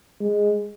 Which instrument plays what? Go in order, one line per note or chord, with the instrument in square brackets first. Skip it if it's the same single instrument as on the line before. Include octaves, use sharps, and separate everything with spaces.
[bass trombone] G#3